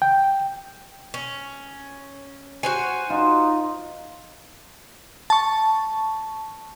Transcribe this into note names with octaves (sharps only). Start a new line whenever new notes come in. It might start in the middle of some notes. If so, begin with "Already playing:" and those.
G5
C#4
F#4 C5 G#5
D#4 F4
A5 C#6